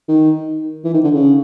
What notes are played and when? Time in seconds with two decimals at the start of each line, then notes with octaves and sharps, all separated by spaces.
0.08 D#3
0.84 E3
0.94 D#3
1.04 D3
1.14 C#3